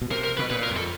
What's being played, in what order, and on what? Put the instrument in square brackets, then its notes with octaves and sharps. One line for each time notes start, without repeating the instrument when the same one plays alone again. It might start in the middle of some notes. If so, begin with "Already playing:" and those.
[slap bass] B2
[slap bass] C3 [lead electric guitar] A#4
[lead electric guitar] A#4
[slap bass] B2 [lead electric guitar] B4
[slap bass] A#2 [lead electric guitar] B4
[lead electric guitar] A#4
[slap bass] F2
[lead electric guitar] A4